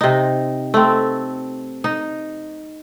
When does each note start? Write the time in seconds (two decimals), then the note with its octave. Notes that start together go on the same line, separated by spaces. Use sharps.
0.01 C3 D#4
0.74 A3 C4
1.84 D#4